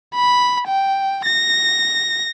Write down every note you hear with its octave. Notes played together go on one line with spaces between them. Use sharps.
B5
G5
A#6